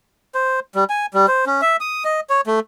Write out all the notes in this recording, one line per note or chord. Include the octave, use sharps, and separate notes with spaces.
C5
G3
G#5
G3
C5
C#4
E5
D#6
D#5
C#5
A3